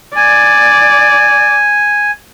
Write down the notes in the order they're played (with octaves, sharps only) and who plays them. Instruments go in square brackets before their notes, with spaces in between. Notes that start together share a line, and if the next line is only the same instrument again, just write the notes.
[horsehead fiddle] D5 [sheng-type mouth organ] G#5